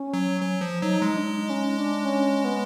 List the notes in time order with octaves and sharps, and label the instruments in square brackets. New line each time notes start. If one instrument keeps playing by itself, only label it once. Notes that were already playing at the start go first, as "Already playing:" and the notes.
Already playing: [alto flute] C#4
[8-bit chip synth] F#3
F#3
F3
[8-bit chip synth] F#3 [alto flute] D#4
[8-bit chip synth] G#3
[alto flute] D4
D#4
C#4
D4
C#4
B3